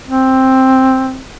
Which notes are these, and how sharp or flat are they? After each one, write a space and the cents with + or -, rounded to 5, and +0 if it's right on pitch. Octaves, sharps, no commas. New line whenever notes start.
C4 +5